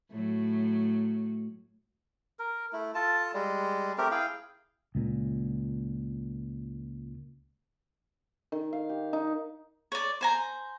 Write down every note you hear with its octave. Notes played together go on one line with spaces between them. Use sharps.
A2 F#3
A#4
A3 E4
F4 A4 A5
G3 G#3
A3 C4 G4 A#4
E4 G#4 F5 G5
C#2 A#2
D#3
F5
G4
D#4
C#5 D5
C5 G#5 A#5